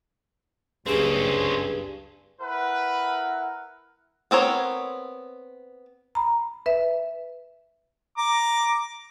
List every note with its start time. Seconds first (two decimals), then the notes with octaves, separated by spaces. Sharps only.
0.86 F#1 C#2 G2 C4 C#4 G#4
2.41 E4 A#4 B4 F#5
4.31 B3 C4 A#4 C#5
6.15 A#5 B5
6.66 B4 E5
8.18 A#5 D6